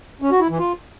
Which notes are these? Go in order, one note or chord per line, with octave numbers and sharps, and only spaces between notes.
C#4
F#4
E4
E3
F4